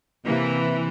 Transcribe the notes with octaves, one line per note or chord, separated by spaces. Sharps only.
C3 E3 A#3